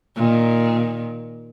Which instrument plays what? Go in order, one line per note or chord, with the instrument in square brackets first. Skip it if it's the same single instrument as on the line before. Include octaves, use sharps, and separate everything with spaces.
[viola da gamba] A#2 D#3